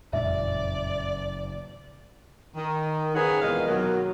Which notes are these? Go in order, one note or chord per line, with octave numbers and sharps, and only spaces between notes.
F#1 F2 A#2 G#3 D5 E5
D#3
C#3 D#4 G#4 B4 C#5 F#5
E2 A#2 D#3 G#3 D#5 F5
D#2 B2 D#3 F#3